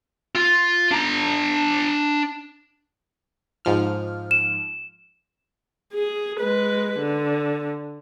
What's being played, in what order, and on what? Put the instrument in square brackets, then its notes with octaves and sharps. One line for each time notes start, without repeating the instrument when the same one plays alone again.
[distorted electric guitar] F4
D4 A#5
[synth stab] G#2 F3 F6
[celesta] E7
[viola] G#4
G#3 B4
D3